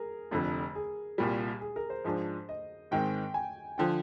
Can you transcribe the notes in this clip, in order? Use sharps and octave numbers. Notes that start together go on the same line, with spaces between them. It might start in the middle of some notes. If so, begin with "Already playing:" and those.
Already playing: G#4 A#4
F1 F2 D3
G#4
C2 A#2 G3
G#4
A#4
C5
G#2 F3 G#3 D4
D#5
G#2 D#3 G#3 C4 G5
G#5
D3 F3 G5